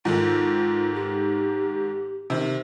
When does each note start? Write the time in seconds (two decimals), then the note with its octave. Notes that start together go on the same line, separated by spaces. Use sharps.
0.05 G#2 D#3 F4 A4
0.94 G4
2.30 C3 D#3